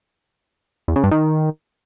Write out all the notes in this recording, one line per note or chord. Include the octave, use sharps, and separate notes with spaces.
E2
C#3
G2
D#3